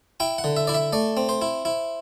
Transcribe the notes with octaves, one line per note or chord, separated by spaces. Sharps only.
E4 G5
F#5
D3
E5
E4 D5
E5
A3 D5
C4
C5
E4
E4